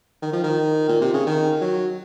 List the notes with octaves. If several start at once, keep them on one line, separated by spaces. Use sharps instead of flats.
D#3
F3
D#3
A#2
C3
C#3
D#3
F#3